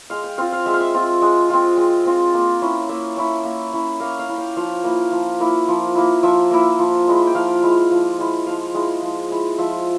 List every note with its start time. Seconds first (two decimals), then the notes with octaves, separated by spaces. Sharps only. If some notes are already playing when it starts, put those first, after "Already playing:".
0.10 G#3 F5
0.24 G5
0.38 C4 F4 F5
0.52 F5
0.66 G#3 E5
0.74 F5
0.80 E5
0.94 C4 F4
1.22 G#3
1.50 C4 F4
1.77 G#3
2.05 C4 F4
2.34 A#3
2.62 C#4 E4
2.89 A#3 E5
3.17 C#4 E4
3.45 A#3
3.73 C#4 E4
4.00 A#3 F5
4.19 F5
4.29 C#4 E4
4.38 G5
4.56 F3 F5
4.84 A#3 E4
5.12 F3
5.40 A#3 E4
5.68 F3
5.95 A#3 E4
6.23 F3 E5
6.51 A#3 E4
6.79 F3
7.08 G#3 E4
7.27 G5
7.35 F3 F5
7.63 G#3 E4
7.91 F3
8.19 G#3 E4
8.46 F3 F5
8.74 G#3 E4
9.02 F3
9.30 G#3 E4
9.58 F3 E5